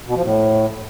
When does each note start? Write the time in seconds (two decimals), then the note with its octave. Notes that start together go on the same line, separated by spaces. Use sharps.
0.07 B2
0.16 F3
0.24 A2